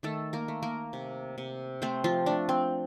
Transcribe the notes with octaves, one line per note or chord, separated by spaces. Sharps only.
D#3 A3 A4
A#3 A#4
A3
A#3 A#4
C3
C3
A3 C4 C5
F3 F4
A3 D4
C4